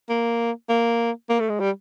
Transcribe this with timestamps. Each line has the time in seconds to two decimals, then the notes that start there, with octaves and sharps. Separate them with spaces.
0.09 A#3
0.69 A#3
1.30 A#3
1.40 A3
1.50 G#3
1.60 G3